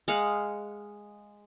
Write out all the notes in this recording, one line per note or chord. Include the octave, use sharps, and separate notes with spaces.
G#3 F5 F#5